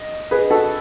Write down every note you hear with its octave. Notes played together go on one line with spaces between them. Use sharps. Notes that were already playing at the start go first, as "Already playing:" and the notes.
Already playing: D#5
G#4 B4
F#4 A4